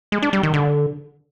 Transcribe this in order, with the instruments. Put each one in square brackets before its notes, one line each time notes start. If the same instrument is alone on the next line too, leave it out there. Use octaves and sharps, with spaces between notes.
[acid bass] G#3
D4
G3
D#3
D3